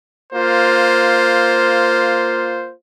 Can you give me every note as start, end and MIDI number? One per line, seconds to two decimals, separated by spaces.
0.33 2.72 58
0.33 2.72 65
0.33 2.72 72